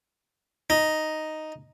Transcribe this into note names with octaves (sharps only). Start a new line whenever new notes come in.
D#4